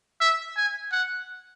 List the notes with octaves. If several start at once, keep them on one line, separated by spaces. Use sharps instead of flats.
E5
G#5
F#5